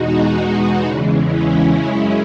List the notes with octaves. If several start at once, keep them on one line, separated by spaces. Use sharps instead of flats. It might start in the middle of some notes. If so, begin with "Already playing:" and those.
Already playing: E2 B2 G#3 D#4 F#4
E2 C#3 E3 G#3
C#4 E4
F#2 C#3 G#3 C#4 E4